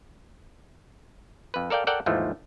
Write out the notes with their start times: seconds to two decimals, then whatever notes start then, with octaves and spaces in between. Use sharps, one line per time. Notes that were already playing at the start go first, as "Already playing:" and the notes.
1.54 F2 B4
1.70 A4 A#4 D5 F5 G5
1.87 A4 A#4 D5 F#5 G5
2.06 D#2 G#2 E3 F3 A3